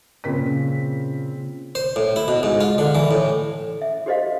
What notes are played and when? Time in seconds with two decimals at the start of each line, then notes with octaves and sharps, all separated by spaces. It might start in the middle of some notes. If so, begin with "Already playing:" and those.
0.24 A#2 C#3 C4 B6
1.75 C5
1.96 A2
2.16 E4
2.28 B2
2.43 G#2
2.61 F4
2.78 D3
2.95 E3
3.11 A2
3.82 E5
4.06 F#4 G4 C5 D#5 F5